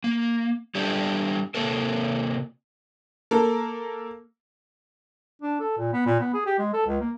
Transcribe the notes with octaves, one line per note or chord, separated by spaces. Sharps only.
A#3
G3 D4 E4 G4 A4
C3 F3 A#3 A4 A#4
A#3 A4 A#4
D4
A4
A#2
B3
A#2
B3
G#4
G4
G#3
A4
C#2
A#3